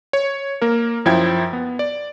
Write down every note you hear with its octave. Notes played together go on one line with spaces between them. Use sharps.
C#5
A#3 A#4
F#2 F3 E4 G5 G#6
B3
D5